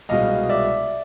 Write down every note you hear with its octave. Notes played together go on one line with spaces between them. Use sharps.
C2 B2 G#3 D#5 F5
D5 E5